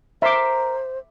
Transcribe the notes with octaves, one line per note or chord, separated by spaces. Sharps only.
A#4 C5 E5 C6 D6